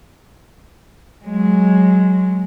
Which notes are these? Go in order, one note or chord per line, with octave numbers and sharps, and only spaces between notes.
F#3 G#3